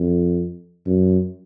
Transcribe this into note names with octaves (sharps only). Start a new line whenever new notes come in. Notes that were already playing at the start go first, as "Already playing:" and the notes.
Already playing: F2
F#2